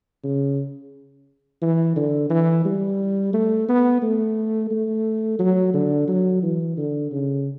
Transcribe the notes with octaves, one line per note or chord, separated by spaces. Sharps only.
C#3
E3
D3
E3
G3
A3
B3
A3
A3
F#3
D3
F#3
E3
D3
C#3